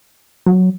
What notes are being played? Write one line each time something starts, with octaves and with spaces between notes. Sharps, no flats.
F#3